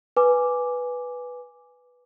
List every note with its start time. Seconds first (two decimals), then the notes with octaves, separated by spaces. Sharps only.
0.17 B4 G#5 D6